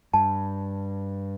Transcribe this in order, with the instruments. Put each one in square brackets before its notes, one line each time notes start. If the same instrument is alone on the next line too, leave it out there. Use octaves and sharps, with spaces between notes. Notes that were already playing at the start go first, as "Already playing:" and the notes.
[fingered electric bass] G2 [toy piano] A5